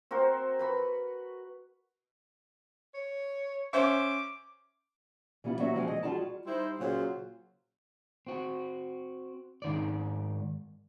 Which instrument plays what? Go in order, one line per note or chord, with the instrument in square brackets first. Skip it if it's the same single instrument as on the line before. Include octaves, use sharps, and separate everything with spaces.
[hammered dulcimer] C4 F#4 A#4 C5
B4 B5 C#6
[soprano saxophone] C#5
[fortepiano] C#4 C5 E5 [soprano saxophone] D6
[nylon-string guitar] E3 G3 B3 E4 F4
F#3 A#3 F#4 G4 D5 E5
B2 E3 F3 G3 G#3 C4
D#5
G3 F4 F#4 G#4 D5 A5
[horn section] G3 D#4 E4 C5
A#2 C#3 F#3 F4 C5
[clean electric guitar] C4 F#4
G#2 D#3 D5